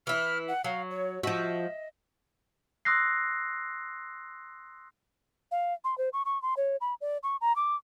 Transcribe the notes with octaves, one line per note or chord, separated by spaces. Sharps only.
E3 E4 F6
F#5
F#3 F5
C#5
F3 F#4 D#5 E5
C6 D#6 E6 F#6 A#6 C7
F5
C6
C5
C#6
C#6
C6
C#5
B5
D5
C#6
A#5
D6